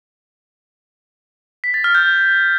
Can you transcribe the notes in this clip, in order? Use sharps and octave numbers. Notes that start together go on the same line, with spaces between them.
B6
A6
F6
G6